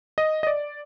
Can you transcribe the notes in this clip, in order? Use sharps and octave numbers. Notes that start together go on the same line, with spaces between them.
D#5
D#5
D5